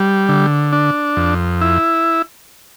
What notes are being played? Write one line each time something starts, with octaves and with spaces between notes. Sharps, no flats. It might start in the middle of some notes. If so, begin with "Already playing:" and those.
Already playing: G3
D3
D4
F2
E4